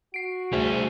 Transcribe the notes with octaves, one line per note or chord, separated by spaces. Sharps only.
F#4 C7 D7
D2 G3 G#4 C5 E5